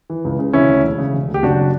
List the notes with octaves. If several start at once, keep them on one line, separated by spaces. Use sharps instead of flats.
E3
C#2
C#3
E1 C#4 E4
D2
E1
C#3
E1
D2
G4
F#1 D4 F#4